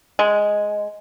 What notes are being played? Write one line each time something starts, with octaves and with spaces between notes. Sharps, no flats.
G#3